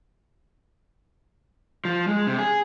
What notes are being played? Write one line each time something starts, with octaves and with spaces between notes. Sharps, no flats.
F3
G#3
C3
G#4